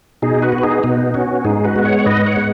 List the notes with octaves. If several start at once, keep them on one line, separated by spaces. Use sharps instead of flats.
B2 D#4 G#4
F#4 B4
B3
B4
D#4 G#4
B2 B3 D#4
B3 C#4 F#4
G#2 D#4 G#4
F#4 B4
G#3 B3
C#5 F#5
F#5
G#2 B4 D#5
C#5 F#5
G#3 B3